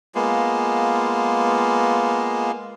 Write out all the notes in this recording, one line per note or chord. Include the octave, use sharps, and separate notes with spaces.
G#3 A#3 B3 F4